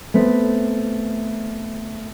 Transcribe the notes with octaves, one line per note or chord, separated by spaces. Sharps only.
A3 B3 C4 B4